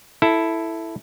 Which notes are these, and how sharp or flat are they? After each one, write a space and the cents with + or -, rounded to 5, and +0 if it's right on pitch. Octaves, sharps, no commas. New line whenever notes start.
E4 +0 A4 +0